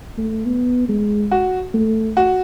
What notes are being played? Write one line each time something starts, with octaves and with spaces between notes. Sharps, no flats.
A3
B3
G#3
F#4
A3
F#4